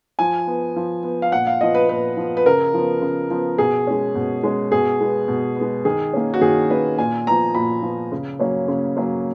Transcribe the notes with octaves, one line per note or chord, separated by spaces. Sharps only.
F3 G#5
B3
F3
B3
F5
A#2 F#5
F5
F3 B3 D#5
B4
A#2 B4
F3 B3
B4
C#3 A#4
F3 B3
C#3
F3 B3
B2 G#4
G#3 C#4
B2
G#3 C#4
B2 G#4
G#3 B3
B2
B3
G#3
D#3 G#4
A#3 C#4
F#4
D#3 G#4
A#3 C#4 B4
A#2 G#5
F3 B3 A#5
A#2 B5
F3 B3
C#3
F#3 A#3 C#4
C#3
F#3 A#3 C#4